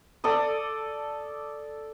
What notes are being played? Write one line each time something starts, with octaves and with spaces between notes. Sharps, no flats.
A4 D5 D#6